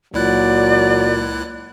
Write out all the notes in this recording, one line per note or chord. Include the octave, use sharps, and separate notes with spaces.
C#2 A#2 F#3 E4 D5 F#6